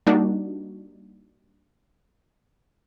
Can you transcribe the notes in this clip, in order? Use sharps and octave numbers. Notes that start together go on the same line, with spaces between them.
G3 A#3 D4 D#4 F#4